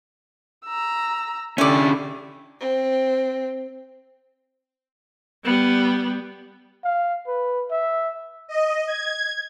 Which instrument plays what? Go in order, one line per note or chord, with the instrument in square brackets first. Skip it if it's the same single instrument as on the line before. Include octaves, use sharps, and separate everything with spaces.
[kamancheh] A#5 E6
[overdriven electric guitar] D3 C#4 [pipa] A3 D5 [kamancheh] E4 G4
[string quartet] C4
[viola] G3 B3
[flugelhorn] F5
B4
E5
[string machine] D#5
G#6